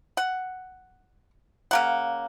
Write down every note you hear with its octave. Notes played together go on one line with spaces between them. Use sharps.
F#5
C#3 A#3 F#5